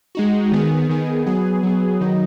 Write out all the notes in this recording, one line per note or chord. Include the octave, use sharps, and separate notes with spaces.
G#3 D#4 F#4
D#3 B3 G#4
D#3 B3 G#4
F#3 B3 G#4
F#3 B3 G#4
D#3 F#3 D#4